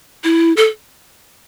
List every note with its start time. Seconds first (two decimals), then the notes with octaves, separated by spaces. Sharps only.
0.24 E4
0.57 A4